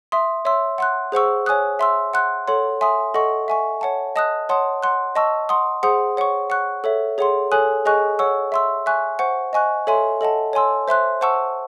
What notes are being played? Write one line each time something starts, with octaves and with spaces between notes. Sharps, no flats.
E5 C6 D#6
C#5 E5 C6 E6
F#5 C6 F#6
G#4 C5 F#5 C#6 E6
C#5 G#5 D#6 F#6
E5 C6 E6
F#5 C6 F#6
A4 C#5 F#5 C6
E5 G#5 C6 D#6
A4 D#5 F#5 C#6
E5 G#5 C#6
C#5 F#5 A5
D#5 A5 D#6 F#6
C#5 F#5 A5 C6 D#6
F#5 C6 F#6
D#5 A5 C#6 E6
F#5 C6 D#6
G#4 C5 F#5 C6 D#6
C#5 F#5 C#6
F#5 C#6 F#6
A4 C#5 E5
G#4 C#5 F#5 C6
A4 C#5 G#5 D#6 F#6
G#4 D#5 G#5 C#6 F#6
C#5 F#5 C#6 E6
E5 C6 E6
E5 G#5 C#6 F#6
C5 F#5 C#6
D#5 G#5 C#6 F#6
A4 C#5 E5 G#5 C6
A4 D#5 F#5 A5
C#5 G#5 C6 E6
C5 E5 C6 F#6
C5 F#5 A5 C#6 E6